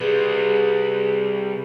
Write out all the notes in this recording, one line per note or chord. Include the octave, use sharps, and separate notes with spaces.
C3 G3 G#4 B4